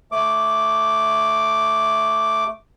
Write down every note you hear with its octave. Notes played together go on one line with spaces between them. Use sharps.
A3 D6